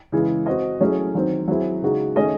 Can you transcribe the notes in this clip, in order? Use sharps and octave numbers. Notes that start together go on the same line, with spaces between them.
C#3 E3 G#3
C4 F#4 C5 D#5
F#3 A3 C#4 E4 G#4
D#3 F#3 C4
F#3 C4 E4 G#4
C#3 G#3 D#4 F#4
D#3 A3 C#4 G#4 D#5